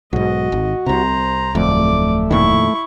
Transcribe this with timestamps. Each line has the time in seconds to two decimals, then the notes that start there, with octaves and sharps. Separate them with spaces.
0.13 B1 G#2 F#4 D#5
0.52 G#1 D2
0.86 C2 C3 C5 A#5
1.55 D1 F2 A3 D5 D6
2.31 F2 A#2 D#3 E4 C#6